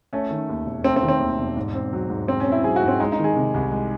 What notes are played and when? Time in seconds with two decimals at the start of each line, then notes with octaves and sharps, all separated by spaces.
0.13 A3 C#4
0.30 D#3
0.49 D#2
0.66 E1
0.84 A3 C4
0.96 C4
1.03 D#3
1.08 C4
1.20 D#2
1.38 E1
1.57 G#2
1.74 C4
1.93 F#3
2.10 G#2
2.28 G#2 C4
2.40 C#4
2.46 C4
2.52 E4
2.64 F#3 G#4
2.76 F#4
2.82 G#2
2.88 C4
3.00 G#3 D#4
3.12 D#4
3.19 D#3
3.24 G#4
3.36 C3
3.54 C2
3.71 G#3